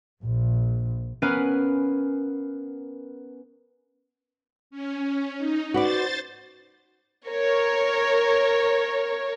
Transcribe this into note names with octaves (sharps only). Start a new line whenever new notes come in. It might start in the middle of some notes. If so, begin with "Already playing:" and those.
A#1
B3 C#4 A#4 B4 F5 G#5
C#4
D#4
F#4 B4 C5 D5 A6
A#4 C#5